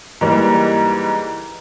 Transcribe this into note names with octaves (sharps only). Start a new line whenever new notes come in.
G#2 E3 G3 A#3